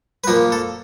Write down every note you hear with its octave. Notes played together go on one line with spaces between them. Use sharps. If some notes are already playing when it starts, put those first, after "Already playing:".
B4
A#2 F3 A#3 A#4
A4